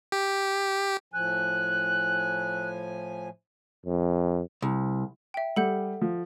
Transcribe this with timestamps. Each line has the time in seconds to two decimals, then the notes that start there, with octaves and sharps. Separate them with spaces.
0.12 G4
1.14 A2 F3 G#5 F#6
3.86 F2
4.62 C2
5.34 E5 G5
5.56 G3 A4 F#5 G6
6.01 F3